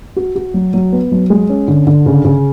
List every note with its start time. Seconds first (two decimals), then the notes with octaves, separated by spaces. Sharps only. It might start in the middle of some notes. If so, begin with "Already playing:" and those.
0.16 F#4
0.35 F#4
0.54 F#3
0.74 F#3
0.92 B3
1.12 F#3
1.30 G#3
1.49 C#4
1.68 D3
1.87 D3
2.06 C#3
2.25 C#3